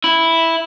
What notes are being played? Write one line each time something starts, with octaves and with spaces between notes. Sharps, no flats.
E4